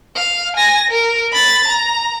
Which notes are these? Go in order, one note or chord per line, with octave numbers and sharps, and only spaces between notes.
F5
G#5 A#6
A#4
B5 A6
A#5